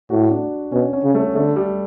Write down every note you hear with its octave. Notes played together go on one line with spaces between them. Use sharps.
A2 F#4
D4
B2 C#4
C#4
C#3
A3
D3 A3
G3